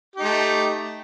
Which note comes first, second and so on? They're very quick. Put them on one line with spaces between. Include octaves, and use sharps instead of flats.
G4 D#4 A3